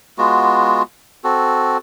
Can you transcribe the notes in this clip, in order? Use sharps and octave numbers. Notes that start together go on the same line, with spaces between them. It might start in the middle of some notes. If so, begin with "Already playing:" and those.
G#3 B3 F4 F#4
C4 F#4 A4